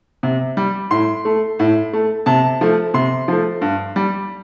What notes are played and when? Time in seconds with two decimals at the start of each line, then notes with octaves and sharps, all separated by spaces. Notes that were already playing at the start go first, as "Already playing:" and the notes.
0.23 C3
0.57 G3
0.91 A2 C6
1.25 A3
1.59 A2
1.93 A3
2.26 C3 A5
2.61 F3 A3
2.94 C3 C6
3.28 F3 A3
3.61 G2
3.96 G3